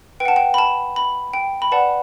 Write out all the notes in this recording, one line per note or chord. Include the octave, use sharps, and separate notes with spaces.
B4 G5
F#5 A5
G5
B5
A5
B5
G5
B5
B4 D5 F#5 A5